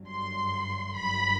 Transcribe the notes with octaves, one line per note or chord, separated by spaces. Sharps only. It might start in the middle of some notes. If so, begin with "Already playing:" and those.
Already playing: G1 G2 F#3
C6
G1 G2 F#3 B5